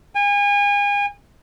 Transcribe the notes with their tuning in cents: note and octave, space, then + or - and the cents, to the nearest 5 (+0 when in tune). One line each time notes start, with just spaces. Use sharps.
G#5 -35